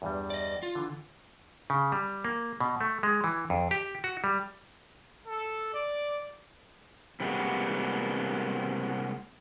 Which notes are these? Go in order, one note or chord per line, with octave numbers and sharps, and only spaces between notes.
E2 G2 G3
D5 D#5
F4
D3 E3
C#3
G3
A#3
B2
A3
G#3
E3
F2
G4
F#4
G3
A4
D5
C3 G3 G#3 A#3 B3 F#4